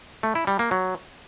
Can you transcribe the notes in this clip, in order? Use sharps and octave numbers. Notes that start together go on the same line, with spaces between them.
A3
E4
G3
A#3
F#3